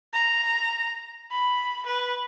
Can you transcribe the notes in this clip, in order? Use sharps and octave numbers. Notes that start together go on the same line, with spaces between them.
A#5
B5
B4